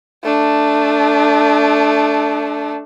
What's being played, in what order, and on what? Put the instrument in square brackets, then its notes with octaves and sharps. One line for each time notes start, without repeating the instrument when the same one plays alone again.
[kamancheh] A3 D4